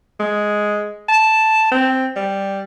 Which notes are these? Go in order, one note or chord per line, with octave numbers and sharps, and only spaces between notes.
G#3
A5
C4
G3